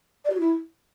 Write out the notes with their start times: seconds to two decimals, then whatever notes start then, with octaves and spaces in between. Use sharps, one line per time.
0.25 D5
0.30 G4
0.35 F#4
0.40 E4